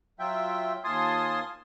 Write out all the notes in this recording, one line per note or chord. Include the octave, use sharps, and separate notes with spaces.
F#3 F4 E5 G5
D#2 F4 G#5 A5 C6 D#6